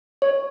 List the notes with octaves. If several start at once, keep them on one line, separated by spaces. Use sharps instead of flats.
C#5